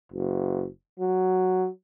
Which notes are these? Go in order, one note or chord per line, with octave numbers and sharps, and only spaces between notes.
F#1
F#3